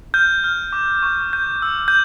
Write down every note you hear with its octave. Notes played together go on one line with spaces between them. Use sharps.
F6 G6
F6
D6
C#6
G6
E6
G6